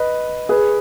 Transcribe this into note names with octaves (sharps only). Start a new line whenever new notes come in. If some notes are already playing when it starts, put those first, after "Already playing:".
Already playing: B4 D#5
G#4 B4